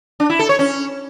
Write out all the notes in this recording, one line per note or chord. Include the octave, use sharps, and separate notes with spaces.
D4
E4
A4
C#5
C#4